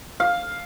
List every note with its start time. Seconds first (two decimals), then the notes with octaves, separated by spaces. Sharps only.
0.20 F5